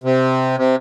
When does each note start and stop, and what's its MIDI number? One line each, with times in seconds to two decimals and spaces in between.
0.04 0.57 48
0.57 0.76 48